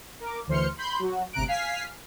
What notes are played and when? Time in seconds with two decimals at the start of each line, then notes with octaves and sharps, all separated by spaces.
0.20 A#4 D6
0.47 D2 E3 C5 C6 F6 C#7
0.77 B5 C6 G6
0.99 F#3 F#4
1.33 G1 D2 C3 A#5 F#6 D7
1.47 F5 G#5 F6 B6 C7